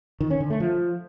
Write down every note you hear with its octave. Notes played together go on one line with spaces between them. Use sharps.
D#3
C#4
D3
A3
F3